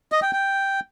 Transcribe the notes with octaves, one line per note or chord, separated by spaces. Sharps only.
D#5
G5
G5